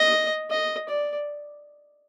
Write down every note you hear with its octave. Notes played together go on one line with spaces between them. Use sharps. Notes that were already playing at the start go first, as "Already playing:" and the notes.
Already playing: D#5
D#5
D5